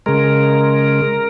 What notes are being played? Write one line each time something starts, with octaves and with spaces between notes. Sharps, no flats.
C#3 G#3 A#4